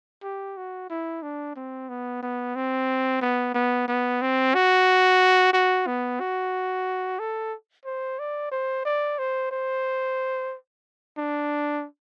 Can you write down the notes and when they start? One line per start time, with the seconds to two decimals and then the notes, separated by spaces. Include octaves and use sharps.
0.23 G4
0.57 F#4
0.90 E4
1.22 D4
1.56 C4
1.89 B3
2.22 B3
2.55 C4
3.21 B3
3.55 B3
3.88 B3
4.22 C4
4.54 F#4
5.53 F#4
5.87 B3
6.20 F#4
7.19 A4
7.85 C5
8.19 D5
8.52 C5
8.85 D5
9.19 C5
9.51 C5
11.18 D4